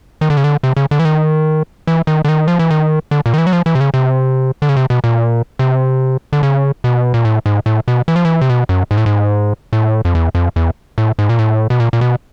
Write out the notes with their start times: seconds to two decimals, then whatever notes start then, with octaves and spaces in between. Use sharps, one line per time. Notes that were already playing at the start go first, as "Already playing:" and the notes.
0.21 D#3
0.30 D3
0.37 C#3
0.44 D3
0.63 C3
0.77 C#3
0.91 D3
0.99 E3
1.05 D#3
1.87 E3
2.07 D#3
2.25 D3
2.29 D#3
2.48 F3
2.59 E3
2.70 D#3
3.11 D3
3.26 A#2
3.34 D#3
3.38 E3
3.47 F#3
3.53 F3
3.66 E3
3.75 C3
3.81 C#3
3.94 C3
4.62 D3
4.69 C#3
4.77 C3
4.90 B2
5.04 A#2
5.59 C3
6.33 D3
6.43 C#3
6.84 B2
7.14 A#2
7.25 A2
7.46 G#2
7.66 A2
7.88 B2
8.08 E3
8.16 F3
8.25 E3
8.41 C3
8.50 B2
8.69 F#2
8.91 G#2
8.98 A2
9.06 G#2
9.73 A2
10.05 F2
10.15 E2
10.35 F2
10.56 E2
10.98 A2
11.19 G#2
11.29 A#2
11.39 A2
11.70 B2
11.80 A#2
11.93 A#2
12.01 B2